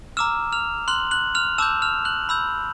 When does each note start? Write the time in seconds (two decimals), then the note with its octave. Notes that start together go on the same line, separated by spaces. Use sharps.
0.17 A#5 D6 E6 F6 E7
0.53 F6 F7
0.88 C6 F6 F#6 F#7
1.11 F#6 F#7
1.35 F6 F7
1.58 A5 D6 E6 G6 E7
1.82 F6 F7
2.05 F#6 F#7
2.29 B5 E6 G6